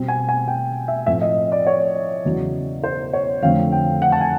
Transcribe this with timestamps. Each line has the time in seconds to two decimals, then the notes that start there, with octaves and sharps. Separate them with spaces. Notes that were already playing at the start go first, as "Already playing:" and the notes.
Already playing: B2 G3 C4
0.08 G#5
0.29 G#5
0.48 G5
0.88 E5
1.07 A2 F3 A3 C4 E5
1.22 D#5
1.52 D5
1.67 C#5
2.25 E2 C#3 F#3
2.84 C5
3.13 C#5
3.42 F2 D3 F3 A3 C4 F5
3.72 G5
4.02 F#5
4.12 A5
4.21 G#5